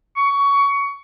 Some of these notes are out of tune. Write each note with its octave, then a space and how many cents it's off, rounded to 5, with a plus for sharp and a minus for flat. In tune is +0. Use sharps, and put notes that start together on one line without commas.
C#6 +20